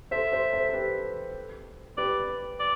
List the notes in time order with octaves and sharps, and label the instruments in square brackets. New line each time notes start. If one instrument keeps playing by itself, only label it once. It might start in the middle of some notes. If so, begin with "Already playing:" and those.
[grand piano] A4 C5 [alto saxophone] E5
[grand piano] A4 C5
A4 C5
A4
G4 B4
[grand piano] G4 B4 [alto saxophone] D5
[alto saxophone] D5